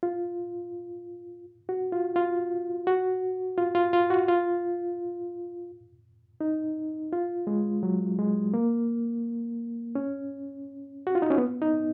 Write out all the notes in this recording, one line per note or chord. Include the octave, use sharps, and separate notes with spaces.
F4
F#4
F4
F4
F#4
F4
F4
F4
F#4
F4
D#4
F4
G#3
F#3
G#3
A#3
C#4
F#4
F4
D#4
C#4
B3
D#4